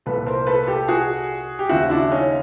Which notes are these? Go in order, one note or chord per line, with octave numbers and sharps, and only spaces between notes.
C2 A#2 F3 A4 B4
A#4 C5
A4 B4
G4 A4
F#4 G#4
G4
D#2 C#3 F3 E4 F#4
D4 E4
C#4 D#4